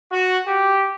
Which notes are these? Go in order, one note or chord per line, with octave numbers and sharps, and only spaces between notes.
F#4
G4